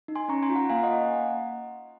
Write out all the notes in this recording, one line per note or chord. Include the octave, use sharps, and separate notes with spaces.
D#4
G#5 C6
C#4 A#5 C#6
G#5 C6
F4
F#5 A#5
A#3 F5 G#5
D#5 F#5